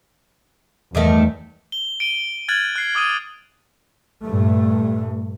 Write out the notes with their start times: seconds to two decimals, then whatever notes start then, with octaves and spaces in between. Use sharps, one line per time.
0.95 E2 G2 D#3 A3
1.72 G7
2.00 D7 D#7 G7
2.48 F6 F#6 G#6 A6 F#7
2.76 F#6 C7
2.95 D6 D#6 F6 D#7
4.23 G2 A#2 A3